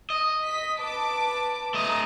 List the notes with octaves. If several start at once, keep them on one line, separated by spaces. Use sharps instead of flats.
D#5
B6
B4 A5 D6
A3 D#5 A#5 D6